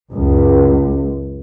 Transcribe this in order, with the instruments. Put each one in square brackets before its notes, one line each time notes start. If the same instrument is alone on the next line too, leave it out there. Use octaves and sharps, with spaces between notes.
[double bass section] C#2 F#2